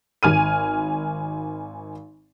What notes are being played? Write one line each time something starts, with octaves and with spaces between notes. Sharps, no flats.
G#1 G#5 F6 D#7